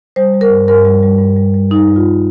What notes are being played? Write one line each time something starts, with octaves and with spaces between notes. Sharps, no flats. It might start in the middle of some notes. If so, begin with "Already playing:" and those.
G3 C5
G3
A#4
G2
G2 A#4
G3
G3
G2
G3
G3
G3 D#4
G2
F4
G2